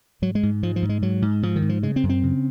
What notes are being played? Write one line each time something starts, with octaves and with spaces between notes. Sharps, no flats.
G#2 F#3
G#3
G#2
G#2 F3
F3
G#2
G#3
G#2 F#3
G#2
G#2 F3
D#3
G#2
F3
C#3 G#3
C4
F#2
C4
C#3